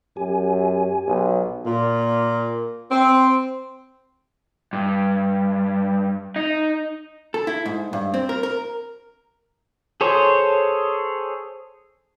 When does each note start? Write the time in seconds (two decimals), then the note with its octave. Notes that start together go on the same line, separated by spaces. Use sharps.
0.17 F#2 G4 G#5
1.08 B1
1.66 A#2
2.91 C4
4.73 G2
6.36 D#4
7.34 A4
7.47 E4
7.65 G#2
7.93 G2
8.14 C4
8.29 A#4
8.43 A#4
10.01 G#4 A4 C5 C#5